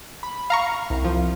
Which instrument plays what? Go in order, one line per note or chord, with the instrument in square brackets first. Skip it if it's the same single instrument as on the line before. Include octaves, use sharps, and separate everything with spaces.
[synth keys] B5
[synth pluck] F5 A#5 C#6
[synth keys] C2
[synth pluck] F3